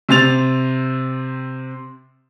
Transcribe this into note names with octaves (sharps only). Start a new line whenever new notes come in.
C3 C4 A6 F7